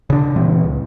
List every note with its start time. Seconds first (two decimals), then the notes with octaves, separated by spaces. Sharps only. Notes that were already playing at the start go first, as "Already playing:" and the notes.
0.10 C#3 D4
0.36 A#2 E3 G3 C4
0.63 C#2